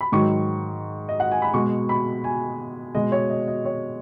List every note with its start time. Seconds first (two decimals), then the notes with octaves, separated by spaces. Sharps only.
0.01 B5
0.12 G#2 D#3 F#3 C#6
1.09 D#5
1.20 F#5
1.32 G#5
1.42 B5
1.54 B2 G#3 C#6
1.89 B5
2.24 G#5
2.95 B2 G#3 D#5
3.12 C#5
3.30 D#5
3.48 D#5
3.65 C#5